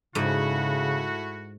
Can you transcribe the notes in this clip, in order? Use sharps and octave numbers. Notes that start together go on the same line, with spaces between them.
G#2 C#3 A3 E4 F#4